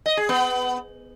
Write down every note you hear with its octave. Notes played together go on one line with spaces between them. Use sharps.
D#5
G#4
B3